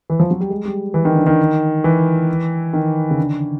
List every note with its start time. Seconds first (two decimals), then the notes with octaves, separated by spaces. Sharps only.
0.10 E3
0.19 F3
0.31 F#3
0.41 G3
0.50 G#3
0.65 G3
0.94 E3
1.05 D#3
1.15 D3
1.27 D#3
1.84 E3
2.73 D#3
3.11 C#3
3.18 D3